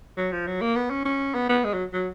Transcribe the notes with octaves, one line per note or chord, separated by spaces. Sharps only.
F#3
F3
F#3
A#3
B3
C#4
C#4
B3
B3
G#3
F#3
F#3